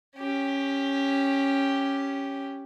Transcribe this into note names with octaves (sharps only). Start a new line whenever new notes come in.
C#4 G4